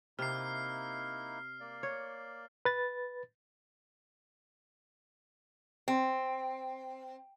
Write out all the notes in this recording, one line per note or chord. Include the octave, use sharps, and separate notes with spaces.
C3 A#3 D#4 E4 F6 C7
A#3 D5
C#5
B4 A6
C4